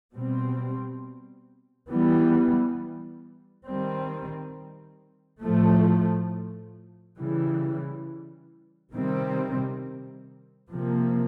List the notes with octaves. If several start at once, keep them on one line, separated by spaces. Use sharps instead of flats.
B2 G3 C4
E3 G3 B3
D#3 G3 C4
A2 F3 A3
C#3 E3 G3
C3 D#3 G3 C4
C3 F3 A#3